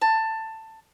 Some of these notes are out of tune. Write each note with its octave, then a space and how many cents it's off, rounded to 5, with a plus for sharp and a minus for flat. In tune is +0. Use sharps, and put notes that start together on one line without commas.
A5 +15